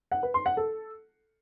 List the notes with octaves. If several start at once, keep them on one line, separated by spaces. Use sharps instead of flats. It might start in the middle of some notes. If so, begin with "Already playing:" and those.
F#5
B4
C6
F#5
A4